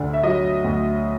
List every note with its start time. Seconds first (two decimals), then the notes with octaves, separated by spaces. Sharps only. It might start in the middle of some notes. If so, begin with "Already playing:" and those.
Already playing: D2 D3
0.13 E5
0.23 F#3 D#5
0.64 D2